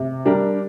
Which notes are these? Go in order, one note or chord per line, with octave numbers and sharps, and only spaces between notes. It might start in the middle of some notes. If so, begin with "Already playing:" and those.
Already playing: C3
G3 D4 G4 A#4